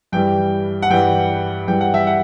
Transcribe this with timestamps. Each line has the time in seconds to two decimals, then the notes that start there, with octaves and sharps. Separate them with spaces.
0.12 G2 E3 G3 G5
0.82 F#5
0.90 G2 E3 G3 G5
1.68 G2 E3 G3 G5
1.81 F#5
1.94 E5
2.07 F#5